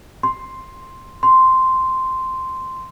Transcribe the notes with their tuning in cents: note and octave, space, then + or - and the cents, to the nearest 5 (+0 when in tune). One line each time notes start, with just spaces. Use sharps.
C6 +5
C6 -5